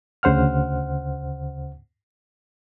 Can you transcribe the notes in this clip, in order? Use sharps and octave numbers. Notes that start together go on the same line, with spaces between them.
D2 C#3 C5 F#5 F6